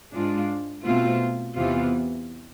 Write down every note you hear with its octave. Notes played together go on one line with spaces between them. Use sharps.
G#2 G#3 D4 F4
B2 A3 C4 F4
E2 C3 E3 B3 F4